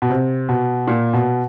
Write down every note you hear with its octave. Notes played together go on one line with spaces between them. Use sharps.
B2
C3
B2
A#2
B2